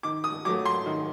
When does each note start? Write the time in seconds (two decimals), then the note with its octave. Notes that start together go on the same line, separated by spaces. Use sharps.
0.03 D#3 D6
0.24 D#6
0.45 F#3 A3 D6
0.65 C6
0.86 D#3